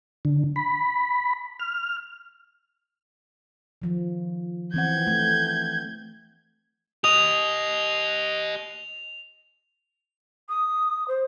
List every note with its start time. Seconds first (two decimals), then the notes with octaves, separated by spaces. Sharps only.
0.25 D3
0.56 B5
1.60 F6
3.82 D#3 F3
4.74 E3 C4 F#5 G6 G#6
5.07 A3
7.04 G4 D#5 D#6 F7
10.49 D#6
11.08 C5